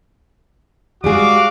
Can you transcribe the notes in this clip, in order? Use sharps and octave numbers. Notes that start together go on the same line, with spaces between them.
G3 G#3 F#4 G#4 F5 D6